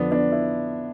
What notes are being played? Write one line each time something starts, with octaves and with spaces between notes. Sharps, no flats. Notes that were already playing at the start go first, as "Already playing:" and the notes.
Already playing: F2 D3 F3 B3 D4
B3 D4
E4